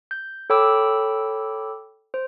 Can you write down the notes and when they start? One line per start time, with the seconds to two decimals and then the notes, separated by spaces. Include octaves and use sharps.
0.11 G6
0.50 A4 C#5 G5 B5 D6 E6
2.14 C5